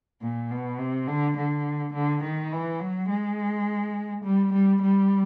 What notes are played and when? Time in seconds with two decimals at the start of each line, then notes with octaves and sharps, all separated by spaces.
0.22 A#2
0.51 B2
0.79 C3
1.07 D3
1.37 D3
1.94 D3
2.24 D#3
2.52 E3
2.80 F#3
3.09 G#3
4.24 G3
4.53 G3
4.82 G3